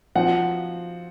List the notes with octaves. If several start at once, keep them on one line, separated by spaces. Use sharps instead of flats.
F3 C4 D#4 F#4 F#5